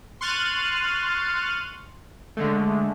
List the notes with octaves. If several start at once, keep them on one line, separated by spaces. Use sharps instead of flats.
C6 C#6 F6 F#6 A6 D#7
D3 G#3 A3